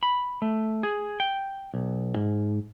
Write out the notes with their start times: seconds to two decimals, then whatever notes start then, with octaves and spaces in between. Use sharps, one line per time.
0.03 B5
0.42 A3
0.83 G#4
1.20 G5
1.74 B1
2.16 G#2